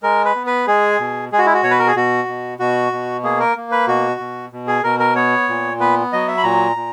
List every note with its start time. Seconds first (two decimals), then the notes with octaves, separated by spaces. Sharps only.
0.03 G#3 A#4
0.25 B4
0.36 B3
0.47 B4
0.67 G#3 G#4
1.00 B2
1.32 G#3 G#4
1.38 F#4
1.46 E4
1.54 F#4
1.63 B2 C#5
1.71 B4
1.79 A#4
1.87 G#4
1.95 B2 F#4
2.28 B2
2.59 B2 F#4
2.92 B2
3.23 A#3 G#4
3.40 A#4
3.56 A#3
3.71 B4
3.88 B2 F#4
4.20 B2
4.52 B2
4.68 G#4
4.84 B2 A#4
4.99 A#4
5.15 B3 C#5
5.49 A#2
5.80 B3 B4
6.13 F#3 D#5
6.28 E5
6.37 B5
6.44 A#2 A#5
6.76 A#2